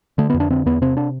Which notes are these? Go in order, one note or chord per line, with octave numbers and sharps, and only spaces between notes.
D3 A3
B3
F2
D4
D3 C4
E2 B3
C3 C4
D4